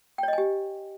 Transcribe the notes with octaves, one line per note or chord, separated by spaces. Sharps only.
G4 C#5 D#5 G5 G#5